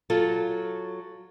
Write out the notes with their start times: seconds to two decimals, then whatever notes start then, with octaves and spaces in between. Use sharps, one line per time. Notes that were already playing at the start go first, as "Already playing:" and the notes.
0.10 F#3 F4 A4